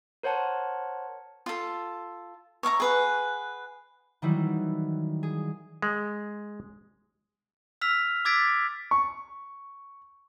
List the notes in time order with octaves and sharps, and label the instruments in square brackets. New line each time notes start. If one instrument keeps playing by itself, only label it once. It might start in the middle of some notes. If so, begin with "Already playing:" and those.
[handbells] A#4 C5 C#5 F#5 A5
[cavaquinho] F4 A4
C#5 E5 F5 A#5
G#4 B4 F#5
[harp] D#3 E3 F#3 G3 E4
G#4
[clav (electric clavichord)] G#3
[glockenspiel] E6 F6 B6 F7
D6 E6 G#6 A6 B6 D7
[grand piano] C#6